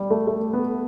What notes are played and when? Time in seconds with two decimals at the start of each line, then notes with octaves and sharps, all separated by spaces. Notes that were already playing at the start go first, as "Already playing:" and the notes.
Already playing: G3
0.11 A3
0.27 A3
0.53 B3